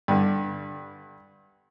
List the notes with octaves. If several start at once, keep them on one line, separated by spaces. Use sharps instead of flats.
G2 D3